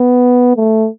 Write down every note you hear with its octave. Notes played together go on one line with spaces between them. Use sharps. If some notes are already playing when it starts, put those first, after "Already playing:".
Already playing: B3
A3